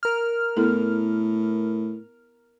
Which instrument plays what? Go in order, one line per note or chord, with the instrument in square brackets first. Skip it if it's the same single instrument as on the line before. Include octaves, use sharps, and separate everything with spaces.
[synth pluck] A#4 F6
[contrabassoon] A2 [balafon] B3 E4 A4